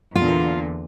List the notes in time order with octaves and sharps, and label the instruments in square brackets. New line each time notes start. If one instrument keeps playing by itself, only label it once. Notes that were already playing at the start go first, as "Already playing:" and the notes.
[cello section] E2 A#2 D3 [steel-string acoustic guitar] F4